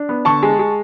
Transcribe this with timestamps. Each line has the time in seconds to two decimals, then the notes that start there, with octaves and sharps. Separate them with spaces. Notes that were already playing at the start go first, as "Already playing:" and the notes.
Already playing: D4
0.09 B3
0.25 D3 A5 C#6
0.43 G#3
0.59 G#3